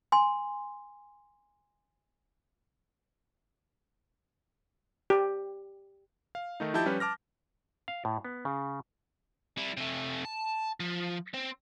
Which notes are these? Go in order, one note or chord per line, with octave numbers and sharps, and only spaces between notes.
G#5 C6
G4
F5
D#3 A3 D#4
F3 D#4 E4 G4 A5 G6
F3 G3 C#4 B4
A5 D6 F6 A#6
F5
A2
B3
C#3
G3 E4
C3 A3
A5
F3
C4